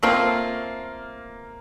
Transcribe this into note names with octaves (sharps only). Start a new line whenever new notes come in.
A3 A#3 C4 F4